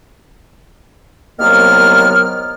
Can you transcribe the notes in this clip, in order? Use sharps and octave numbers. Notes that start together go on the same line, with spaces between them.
C2 D#3 F#3 A#3 B3 F6